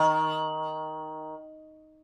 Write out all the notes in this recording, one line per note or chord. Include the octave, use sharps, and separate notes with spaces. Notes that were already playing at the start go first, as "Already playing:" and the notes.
Already playing: D#3